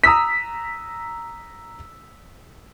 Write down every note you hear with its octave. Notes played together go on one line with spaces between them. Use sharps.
A#5 D#6 E6 B6